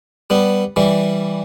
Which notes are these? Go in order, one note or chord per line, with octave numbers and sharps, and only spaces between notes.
G3 B3
E3 G3